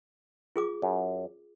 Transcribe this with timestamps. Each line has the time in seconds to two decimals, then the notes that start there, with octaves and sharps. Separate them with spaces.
0.56 F4 G#4 D6
0.82 F#2